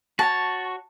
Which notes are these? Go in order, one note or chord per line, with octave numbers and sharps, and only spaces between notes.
F#4 C#5 A5